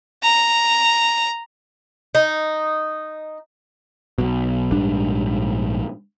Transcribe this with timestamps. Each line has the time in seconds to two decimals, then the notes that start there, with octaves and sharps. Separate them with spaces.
0.23 A#5
2.15 D#4
4.18 B1 B2
4.72 A#1 G#2 G3 D4